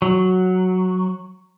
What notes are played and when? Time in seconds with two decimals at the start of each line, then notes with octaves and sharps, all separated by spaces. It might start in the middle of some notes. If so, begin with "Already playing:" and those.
0.02 F#3